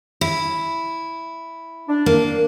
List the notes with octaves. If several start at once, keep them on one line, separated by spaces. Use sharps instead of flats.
E4
D4
A#3